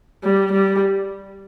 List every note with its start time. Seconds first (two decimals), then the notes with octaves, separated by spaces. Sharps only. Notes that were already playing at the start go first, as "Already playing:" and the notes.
0.23 G3
0.52 G3